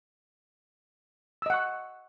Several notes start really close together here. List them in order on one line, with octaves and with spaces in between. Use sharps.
E6 D#5 F#5 C#6